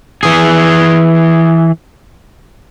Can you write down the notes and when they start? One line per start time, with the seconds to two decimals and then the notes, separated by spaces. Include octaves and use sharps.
0.23 E3 G#4